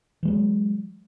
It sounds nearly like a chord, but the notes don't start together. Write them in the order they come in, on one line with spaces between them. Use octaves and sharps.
E3 G#3 F#3